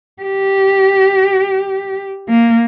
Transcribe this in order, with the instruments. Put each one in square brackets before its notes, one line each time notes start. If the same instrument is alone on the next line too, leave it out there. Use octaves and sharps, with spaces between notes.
[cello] G4
A#3